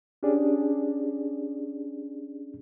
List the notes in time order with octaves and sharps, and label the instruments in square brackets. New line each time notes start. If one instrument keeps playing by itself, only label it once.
[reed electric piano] C#4 D4 G4 G#4 D5